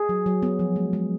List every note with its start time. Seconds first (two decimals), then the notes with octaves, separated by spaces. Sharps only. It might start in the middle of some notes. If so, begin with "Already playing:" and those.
Already playing: G#4
0.09 F#3
0.26 F#3
0.43 B3
0.59 F3
0.76 G#3
0.93 G#3